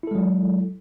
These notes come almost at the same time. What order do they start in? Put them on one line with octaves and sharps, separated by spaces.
E4 A4 G#3 F#3